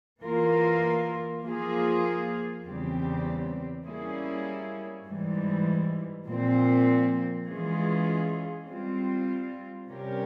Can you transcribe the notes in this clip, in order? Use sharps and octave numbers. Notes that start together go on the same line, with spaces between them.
E3 A#3 F4 A#4
F3 A#3 F4 G#4
E2 C#3 G3 C4 G4
G3 A#3 C#4 E4 G#4
G#2 E3 G3
A#2 F3 C4
E3 G#3 C#4 F4 G#4
G3 C4 F4
C3 G3 C#4 G4 A#4